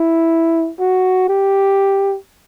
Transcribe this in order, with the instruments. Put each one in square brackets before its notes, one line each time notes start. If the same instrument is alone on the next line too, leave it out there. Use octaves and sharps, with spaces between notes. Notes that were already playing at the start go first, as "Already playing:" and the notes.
Already playing: [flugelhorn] E4
F#4
G4